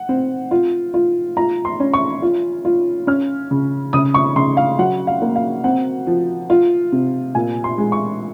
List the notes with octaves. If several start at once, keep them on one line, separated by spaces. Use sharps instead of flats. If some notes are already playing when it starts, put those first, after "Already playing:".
Already playing: F#5
C4
F4
F4
F4 A#5
C6
C#4
C#6
F4
F4
C#4 F6
C#3
C#3 D#6
C#6
C#3 C6
F5
F#3 F#5
F5
A#3
F5
C4 F#5
F3
F4
C3
A#2 G#5
C6
G#3
C#6